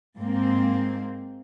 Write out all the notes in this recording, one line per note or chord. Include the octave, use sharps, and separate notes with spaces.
G#2 A#3 C4